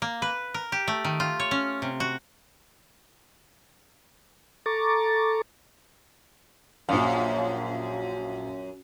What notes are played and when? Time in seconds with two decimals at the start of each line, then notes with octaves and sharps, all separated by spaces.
0.02 A#3
0.22 B4
0.54 A#4
0.72 G4
0.88 A3
1.05 D#3
1.20 F4
1.40 C#5
1.51 C#4
1.82 C3
2.00 F#4
4.66 A4 A#5 C#6 D6 A6
6.89 A#1 F#2 F5